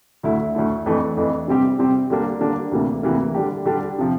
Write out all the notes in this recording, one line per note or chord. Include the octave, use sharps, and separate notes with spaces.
D2 D3 A3 E4
D2 D3 A3 E4
F2 E3 A3 D4
F2 E3 A3 D4
C3 G3 C4 G4
C3 G3 C4 G4
D3 G3 A#3 D4
D3 G3 A#3 D4
D2 C3 E3 A#3
D2 C3 E3 A#3
D3 G3 D4 G4
D3 G3 D4 G4
C3 F3